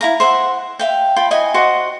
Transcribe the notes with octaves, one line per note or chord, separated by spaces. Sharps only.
E4 F5 A#5
C5 E5 F#5
E5 F5 G5
F4 G5 B5
E4 F#4 D#5 G#5
F#4 C5 D#5 F#5